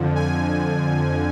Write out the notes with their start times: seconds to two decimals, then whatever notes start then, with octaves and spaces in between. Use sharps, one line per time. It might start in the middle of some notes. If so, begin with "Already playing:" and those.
Already playing: F2 D3 F3
0.15 G#5